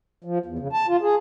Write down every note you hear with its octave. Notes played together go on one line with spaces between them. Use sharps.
F3
E2
C#3
A5
F4
G#4